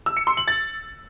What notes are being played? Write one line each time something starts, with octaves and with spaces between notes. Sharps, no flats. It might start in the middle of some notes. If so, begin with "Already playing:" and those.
E6
C#7
C6
F#7
A6